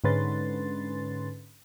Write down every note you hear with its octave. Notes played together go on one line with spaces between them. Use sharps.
G#2 D3 C#4 B4 C6 A6